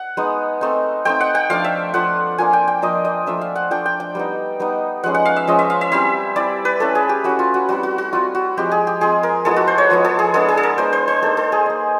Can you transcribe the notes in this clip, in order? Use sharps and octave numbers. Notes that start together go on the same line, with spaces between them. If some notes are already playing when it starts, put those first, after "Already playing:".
Already playing: F#5
G#3 B3 D#4
A3 C4 D#4
A3 C4 D#4 G5
F#5
G5
F3 A3 D4 F4 F5
E5
F3 A3 D4 F4 F#5
F3 A#3 D4 G#5
G5
G5
F3 A#3 D4 D#5
D#5
F3 A3 D4 E5
F5
F#5
F3 A3 D4 G5
G5
G5
G3 B3 D#4
G3 B3 D#4
F3 G#3 C#4 F#5
F#5
F5
E5
F3 G#3 C#4 D#5
E5
F5
E5
G3 C4 E4 E5
G3 C4 E4 D5
B4
A3 C#4 E4 A4
G#4
G4
A3 C#4 E4 F#4
F4
F#4
G3 C4 E4 F#4
F#4
F#4
G3 C4 E4 F4
F#4
F3 G#3 C4 G4
G#4
G4
F3 G#3 C4 G#4
A#4
F3 G#3 B3 E4 A4
F#4
C5
C#5
F3 G#3 B3 E4
A4
G#4
G#3 B3 D4 A4
G#4
A4
A#4
G#3 B3 D4 C5
C5
C5
A#3 D#4 A4
A4
G#4
A#3 D#4